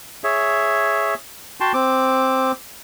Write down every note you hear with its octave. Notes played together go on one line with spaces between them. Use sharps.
G#4 C#5 E5
F#4 G5 A5 C6
C4 D6